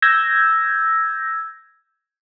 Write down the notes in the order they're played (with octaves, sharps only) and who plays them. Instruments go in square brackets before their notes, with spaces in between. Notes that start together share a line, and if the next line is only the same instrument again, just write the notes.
[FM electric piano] E6 G6 G#6 A#6